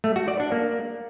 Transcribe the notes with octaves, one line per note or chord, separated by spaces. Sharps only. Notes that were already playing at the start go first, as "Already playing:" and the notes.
A3
F#4
D5
D4
A#3